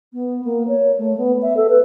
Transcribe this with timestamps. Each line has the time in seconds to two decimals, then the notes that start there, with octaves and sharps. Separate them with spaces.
0.13 B3
0.44 A#3
0.68 C#5
0.98 A3
1.17 B3
1.42 E5
1.56 A4
1.69 B4